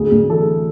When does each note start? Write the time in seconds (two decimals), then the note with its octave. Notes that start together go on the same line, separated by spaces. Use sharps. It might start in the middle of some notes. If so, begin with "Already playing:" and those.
Already playing: D2 G#4
0.12 D2
0.30 E3 A4